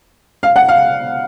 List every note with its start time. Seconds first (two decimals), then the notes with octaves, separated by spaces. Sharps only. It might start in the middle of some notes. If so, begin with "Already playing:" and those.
0.43 F5
0.56 F#5
0.69 F5